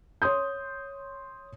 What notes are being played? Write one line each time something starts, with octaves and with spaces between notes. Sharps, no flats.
C#5 C6 D#6 G6